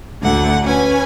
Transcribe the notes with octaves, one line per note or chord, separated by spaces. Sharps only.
D2 A2 D3 F#5
C#4 B4 G#5